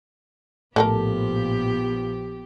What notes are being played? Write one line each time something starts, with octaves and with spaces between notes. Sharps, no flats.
A#1 A2 F3 A3 B3 G4 A4 A#4